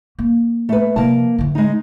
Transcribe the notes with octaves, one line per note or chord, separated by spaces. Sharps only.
A#3
A3 B4
C3 F3 A#3 A5
D3 E3
G#3 D#4